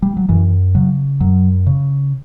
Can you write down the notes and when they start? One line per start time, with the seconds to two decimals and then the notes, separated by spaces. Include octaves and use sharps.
0.02 G3
0.17 F#3
0.29 F#2 E3
0.75 C#3 F#3
1.20 F#2 F#3
1.66 C#3